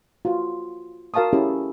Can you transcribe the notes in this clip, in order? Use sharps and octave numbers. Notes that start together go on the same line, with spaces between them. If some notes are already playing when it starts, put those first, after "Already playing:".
F4 F#4
F#4 A#4 F5 A5 C#6 D#6
C#4 E4 G4 G#4